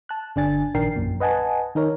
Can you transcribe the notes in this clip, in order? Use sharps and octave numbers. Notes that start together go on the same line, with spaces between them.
A5 F#6
G1 D3 D4 G#5 A6
A#1 D#3 D4 A#4 G5 C7
A#1 F#2 A#2
B4 D#5 F#5 G#5 A5
D#3 D#4 A#4 C#5